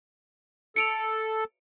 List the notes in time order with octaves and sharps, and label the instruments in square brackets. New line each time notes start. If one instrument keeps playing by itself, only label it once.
[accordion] A4 [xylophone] C#7 D7 F7